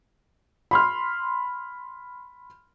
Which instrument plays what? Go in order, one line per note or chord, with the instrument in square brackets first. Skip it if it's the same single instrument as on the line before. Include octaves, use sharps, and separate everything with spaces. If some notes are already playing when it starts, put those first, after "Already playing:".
[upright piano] B5 C6 F6